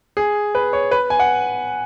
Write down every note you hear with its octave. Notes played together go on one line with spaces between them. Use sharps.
G#4
B4
C#5
B4
G#5
F#5